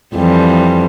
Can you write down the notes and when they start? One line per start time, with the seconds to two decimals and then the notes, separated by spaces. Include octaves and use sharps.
0.15 F2 E3 G3